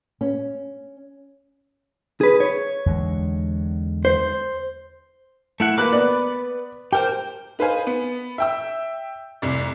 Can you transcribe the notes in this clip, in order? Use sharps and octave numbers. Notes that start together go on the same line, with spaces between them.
C#4
G#4 B4
C#5
E2 D3 G#3
C5
A3 E4 F#5
A#3 B4 B5 D6 F#6
B3 D5
G4 A#4 C5 G5
D#4 B4 C5 F5 G#5
B3
E5 G5 E6
F1 C2 D5